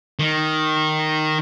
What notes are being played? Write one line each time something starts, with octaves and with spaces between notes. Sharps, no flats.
D#3